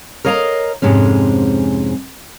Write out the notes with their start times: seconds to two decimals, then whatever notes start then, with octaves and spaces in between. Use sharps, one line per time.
0.25 A#4 C#5 D#5 F5 A5 A#5
0.82 F2 G#2 C3 G#3 C#4